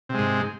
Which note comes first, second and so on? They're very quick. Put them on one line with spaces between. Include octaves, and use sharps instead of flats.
C3 G#3 G#2